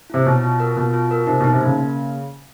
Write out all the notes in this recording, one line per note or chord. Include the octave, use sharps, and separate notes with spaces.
C3 E4
B2 C#5
F4
A#4
B2 F4
F4
A#4
C3 D#4
B2 D#4
C3
C#3 A#3
A#3